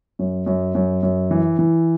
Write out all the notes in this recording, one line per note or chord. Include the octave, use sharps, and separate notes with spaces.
F#2
F#2
F#2
F#2
E3
E3